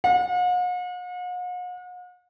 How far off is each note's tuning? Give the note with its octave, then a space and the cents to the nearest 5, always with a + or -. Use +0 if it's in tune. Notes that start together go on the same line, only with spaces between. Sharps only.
F#5 -45